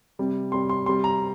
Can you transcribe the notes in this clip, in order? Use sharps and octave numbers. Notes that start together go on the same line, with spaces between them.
C3 G3
C3 G3 C6
C6
C3 G3 C6
A#5